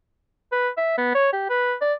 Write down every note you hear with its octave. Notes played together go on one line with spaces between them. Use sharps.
B4
E5
B3
C#5
G4
B4
D5